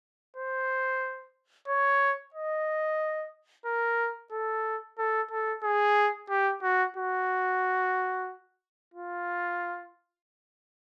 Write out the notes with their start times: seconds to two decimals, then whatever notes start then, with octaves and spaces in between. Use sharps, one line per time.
0.36 C5
1.68 C#5
2.34 D#5
3.66 A#4
4.32 A4
4.99 A4
5.31 A4
5.64 G#4
6.30 G4
6.63 F#4
6.97 F#4
8.94 F4